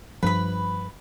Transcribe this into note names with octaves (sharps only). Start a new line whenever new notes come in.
G2 F3 B4 B5